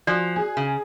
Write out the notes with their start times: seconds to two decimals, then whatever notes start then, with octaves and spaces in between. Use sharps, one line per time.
0.07 F3 F#4 D5 G#5 F#6
0.36 G#4
0.57 C#3